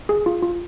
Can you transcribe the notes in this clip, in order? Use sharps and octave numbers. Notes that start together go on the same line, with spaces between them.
G#4
F4
F4